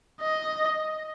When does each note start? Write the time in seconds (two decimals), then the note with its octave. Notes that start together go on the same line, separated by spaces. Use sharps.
0.21 D#5